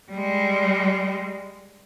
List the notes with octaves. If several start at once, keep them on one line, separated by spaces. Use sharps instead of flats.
G3 G#3